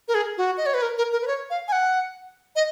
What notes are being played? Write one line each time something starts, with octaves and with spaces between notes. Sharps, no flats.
A#4
G#4
F#4
D#5
C#5
B4
A#4
A#4
A#4
B4
C#5
F5
G#5
F#5
D#5